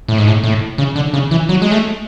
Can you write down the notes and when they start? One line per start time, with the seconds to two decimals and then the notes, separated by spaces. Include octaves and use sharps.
0.08 A2
0.18 G#2
0.28 A2
0.44 A2
0.78 C#3
0.96 D3
1.14 C#3
1.31 E3
1.49 F#3
1.62 G#3
1.71 A3